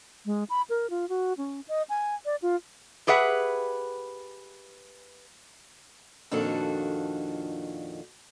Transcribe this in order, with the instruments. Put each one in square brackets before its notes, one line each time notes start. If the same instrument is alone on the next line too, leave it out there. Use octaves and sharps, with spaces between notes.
[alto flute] G#3
B5
A#4
F4
F#4
C#4
D#5
G#5
D5
F4
[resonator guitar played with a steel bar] G4 G#4 B4 E5 F#5
[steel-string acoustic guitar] F2 A#2 D#3 D4 F#4 A4